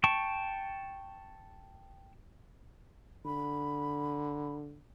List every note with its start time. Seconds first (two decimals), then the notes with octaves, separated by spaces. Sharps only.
0.04 G5 A5 C#6
3.25 D3 B5